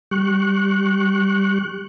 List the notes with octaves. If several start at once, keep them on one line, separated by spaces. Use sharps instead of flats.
G3 C#6 F#6